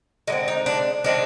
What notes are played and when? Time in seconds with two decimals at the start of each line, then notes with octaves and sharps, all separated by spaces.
0.27 D3 G#3 C4 D#4
0.48 D#4
0.66 D4
1.04 D#3 G#3 C4 D4